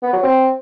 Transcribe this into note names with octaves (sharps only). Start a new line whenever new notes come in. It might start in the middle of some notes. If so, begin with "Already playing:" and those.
B3
F#3
C4